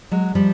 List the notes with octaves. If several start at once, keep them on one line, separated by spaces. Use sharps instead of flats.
F#3 G#3
F3 G3